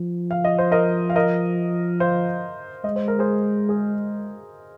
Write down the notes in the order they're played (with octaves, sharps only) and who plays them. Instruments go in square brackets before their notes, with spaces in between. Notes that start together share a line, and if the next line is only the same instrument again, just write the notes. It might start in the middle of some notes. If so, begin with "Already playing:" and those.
Already playing: [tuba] F3
[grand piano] F5
D#5
C5
A#4 D#5
F5
A#4 D#5
C5 F5
[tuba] G#3 [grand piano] D#5
[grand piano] C5
A#4
G#4 C5
G#4